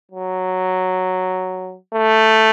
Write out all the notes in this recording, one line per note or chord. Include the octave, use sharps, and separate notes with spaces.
F#3
A3